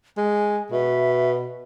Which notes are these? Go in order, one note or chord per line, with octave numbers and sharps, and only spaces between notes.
G#3 G#5
B2 E5